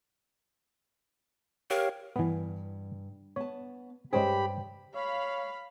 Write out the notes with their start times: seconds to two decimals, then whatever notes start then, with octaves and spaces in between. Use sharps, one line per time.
1.71 G4 A#4 C#5 F5
2.16 G2 E3 B3
3.36 B3 C#5 A5
4.13 G2 G#3 C#4 G4 G#4 C5 G5 B5
4.95 C#5 F5 B5